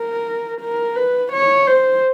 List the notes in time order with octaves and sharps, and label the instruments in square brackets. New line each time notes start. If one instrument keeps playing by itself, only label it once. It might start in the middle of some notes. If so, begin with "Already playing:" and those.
Already playing: [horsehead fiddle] A#4
A#4
B4
C#5
C5